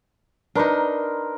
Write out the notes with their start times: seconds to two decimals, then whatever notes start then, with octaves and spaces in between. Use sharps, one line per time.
0.55 D4 D#4 A#4 B4 C6